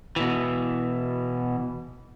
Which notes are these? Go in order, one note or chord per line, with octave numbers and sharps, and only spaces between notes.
B2 E3